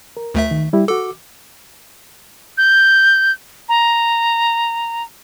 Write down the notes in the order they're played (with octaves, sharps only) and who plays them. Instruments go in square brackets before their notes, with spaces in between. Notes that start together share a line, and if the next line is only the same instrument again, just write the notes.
[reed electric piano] A#4
[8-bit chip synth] D2 A3 E5
[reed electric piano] D#3
G3 E4 G4
[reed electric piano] F#4 D6 [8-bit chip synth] A4
[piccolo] G6
A#5